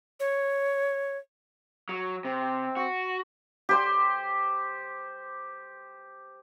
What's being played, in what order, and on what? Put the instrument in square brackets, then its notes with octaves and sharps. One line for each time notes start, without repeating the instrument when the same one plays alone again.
[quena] C#5
[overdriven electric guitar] F#3
[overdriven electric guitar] C3 [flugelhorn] C4
[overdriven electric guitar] F#4
[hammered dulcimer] G4 C5 C6